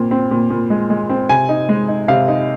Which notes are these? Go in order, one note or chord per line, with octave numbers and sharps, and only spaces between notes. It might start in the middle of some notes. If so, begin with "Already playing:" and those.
Already playing: A#2 C4
C4
A#2
A#2
G#3
G#3
C4
C3 G#5
D#4
G#3
D#4
C3 F5
D#4